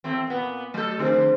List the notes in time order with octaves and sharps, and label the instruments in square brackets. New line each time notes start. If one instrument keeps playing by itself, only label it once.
[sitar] E2 A3 C4
A#2 B3
[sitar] F#3 A4 [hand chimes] A3 G6
[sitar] F2 D3 [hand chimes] G#4 C5